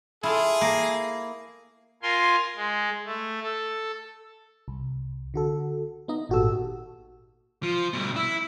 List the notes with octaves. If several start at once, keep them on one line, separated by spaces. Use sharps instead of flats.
E4 F4 G#4 A4
A#3
F4 A#4 G#5 C6
G#3
A3
A4
C2
D3 F#4 A4
B3 D#4 D#5
G#1 A#2 F#4 G4 A4 E6
F3
G2 B2
E4